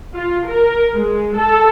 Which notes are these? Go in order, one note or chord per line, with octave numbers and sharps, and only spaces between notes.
F4
A#4
G#3
A4